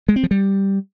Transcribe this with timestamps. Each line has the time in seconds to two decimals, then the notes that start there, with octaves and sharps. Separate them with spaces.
0.09 G#3
0.16 C4
0.23 F3
0.31 G3